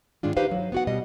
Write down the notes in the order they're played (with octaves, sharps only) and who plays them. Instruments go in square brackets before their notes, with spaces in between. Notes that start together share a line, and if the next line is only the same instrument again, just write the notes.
[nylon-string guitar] G#2 D#3 G#3 D4 F4
D#4 G4 B4 C5 F5
F#3
B3 F#4 F#5
B2 G3 D#5